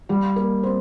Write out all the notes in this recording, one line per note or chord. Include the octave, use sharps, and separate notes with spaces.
G3 G4
A#3 A#4
C4 C5